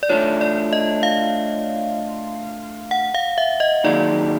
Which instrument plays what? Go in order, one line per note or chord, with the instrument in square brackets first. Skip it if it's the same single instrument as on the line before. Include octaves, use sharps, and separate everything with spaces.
[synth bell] D5
[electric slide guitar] A3 D4 F4 [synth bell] C#5
[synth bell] D5
D#5
F5
F#5
F5
E5
D#5
[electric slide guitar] D#3 F#3 A#3 D#4 G#4 [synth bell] D5